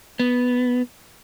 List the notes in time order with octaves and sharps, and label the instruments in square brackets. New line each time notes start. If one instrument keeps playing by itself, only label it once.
[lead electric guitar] B3